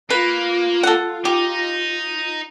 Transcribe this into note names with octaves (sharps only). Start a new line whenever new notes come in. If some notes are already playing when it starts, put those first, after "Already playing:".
A#3 F4 B4
A4 F#5
D#4 G4